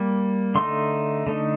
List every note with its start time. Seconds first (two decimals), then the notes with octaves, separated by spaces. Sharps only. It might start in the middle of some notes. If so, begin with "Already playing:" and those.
Already playing: G3 A#3
0.55 D3 A3 D#4 C6
1.27 D3 A3 D#4